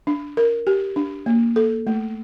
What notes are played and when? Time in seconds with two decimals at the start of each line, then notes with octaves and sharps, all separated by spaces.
0.07 D4
0.37 A#4
0.67 G4
0.96 D4
1.26 A#3
1.56 A4
1.87 A3